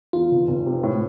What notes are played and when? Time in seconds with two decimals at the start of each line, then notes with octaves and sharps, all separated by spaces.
0.13 E2 F4
0.32 F1
0.48 F1
0.66 C3
0.83 A2